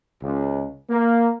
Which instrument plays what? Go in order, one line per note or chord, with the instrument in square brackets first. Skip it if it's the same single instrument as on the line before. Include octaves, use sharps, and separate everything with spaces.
[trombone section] C#2
A#3